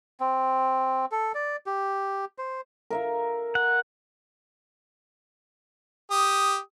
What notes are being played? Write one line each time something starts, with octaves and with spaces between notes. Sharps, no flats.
C4
A4
D5
G4
C5
A#4 E5 F5
F#5
G4 D#6